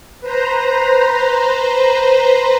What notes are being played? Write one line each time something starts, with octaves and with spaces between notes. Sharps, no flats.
B4 C5 A#5